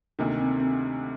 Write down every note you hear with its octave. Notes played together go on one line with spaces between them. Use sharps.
D2 C3 D#3 A#3
C4
C4